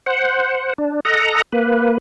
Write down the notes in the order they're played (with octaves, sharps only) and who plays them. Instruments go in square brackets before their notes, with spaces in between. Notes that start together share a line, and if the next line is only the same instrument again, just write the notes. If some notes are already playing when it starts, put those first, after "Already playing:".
[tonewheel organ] C5 F#5
D4
A4 D#5 F#5 A#5
A#3 B4